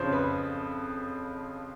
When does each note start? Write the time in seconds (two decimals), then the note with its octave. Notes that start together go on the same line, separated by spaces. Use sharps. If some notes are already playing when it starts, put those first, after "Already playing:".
Already playing: F2 C#3 F3 C5 C#5
0.13 B4